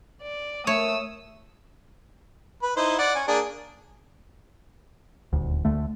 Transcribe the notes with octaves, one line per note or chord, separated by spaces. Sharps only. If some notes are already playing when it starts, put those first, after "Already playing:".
D5
A3 C#5 D#6 E6
B4
D#4 E4 C5
D5 F#5
C#4 G#5
A#3 D4 G#4
D#1 D2
D2 D3 A3